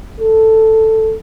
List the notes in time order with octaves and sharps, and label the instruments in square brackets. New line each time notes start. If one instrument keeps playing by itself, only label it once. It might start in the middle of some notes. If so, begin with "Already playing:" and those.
[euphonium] A4